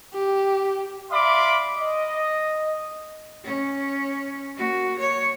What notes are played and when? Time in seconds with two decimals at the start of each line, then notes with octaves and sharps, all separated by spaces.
0.14 G4
1.10 D5 E5 F5 B5 C6 D6
1.78 D#5
3.45 C#4
4.56 A#3 F#4
4.99 C#5